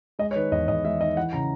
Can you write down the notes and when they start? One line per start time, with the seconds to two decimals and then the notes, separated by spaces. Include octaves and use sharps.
0.19 G#3 D#5
0.31 C#5
0.36 D#3 B4
0.52 E2 D#5
0.68 E2 D#5
0.85 G#3 E5
1.00 D#3 D#5
1.17 E3 F#5
1.33 C#3 A#5